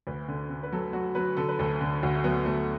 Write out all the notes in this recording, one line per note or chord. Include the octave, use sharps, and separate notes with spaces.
D2 B4
D3
D3
B4
F#3 A4
F#3 F#4
F#3 B4
D3 A4
B4
D2 A4
D3
D2 F#4
A3
F#3 B3
D2 A3